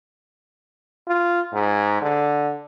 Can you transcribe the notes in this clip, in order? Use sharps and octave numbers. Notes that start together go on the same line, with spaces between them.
F4
G#2
D3